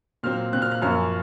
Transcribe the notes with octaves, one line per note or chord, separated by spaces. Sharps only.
A#2 F#3 C4 F6
A#2 F#3 C4 F#6
F6
F#6
F#2 F3 A#3 C#4 F6